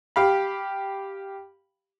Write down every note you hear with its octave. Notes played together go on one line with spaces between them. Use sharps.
G4 F5 B5